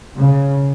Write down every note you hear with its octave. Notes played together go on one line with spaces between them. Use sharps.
C#3